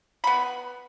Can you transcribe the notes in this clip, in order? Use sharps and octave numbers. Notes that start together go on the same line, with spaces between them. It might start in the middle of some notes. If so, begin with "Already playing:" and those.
B3 B5